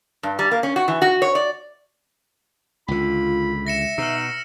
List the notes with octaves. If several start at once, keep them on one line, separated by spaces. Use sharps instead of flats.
G2
G3
A#3
C#4
F#4
E3
F#4
C#5
D5
C#2 D3 F4 B5
E5 A#6 C#7 E7
B2 D#4 E6 F6